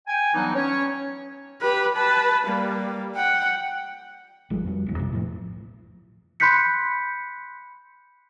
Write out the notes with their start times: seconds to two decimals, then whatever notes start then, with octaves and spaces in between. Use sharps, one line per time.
0.07 G5 G#5
0.34 E3 F#3 G3 B3 D4 D#4
0.55 C#4 C#5
1.62 G4 B4
1.95 B4 A5
2.46 G3 A#3
3.15 F#5 G5
4.50 G#1 F3 G3
4.64 F2 F#3 G3
4.86 D1 D#2
4.98 A#1 F2 C3
5.13 A2 D3 F3
6.40 B5 C6 F#6 G6 B6 C#7